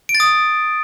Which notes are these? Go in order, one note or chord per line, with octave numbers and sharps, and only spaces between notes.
D7
A6
D#6